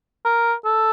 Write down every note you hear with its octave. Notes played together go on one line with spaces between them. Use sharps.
A#4
A4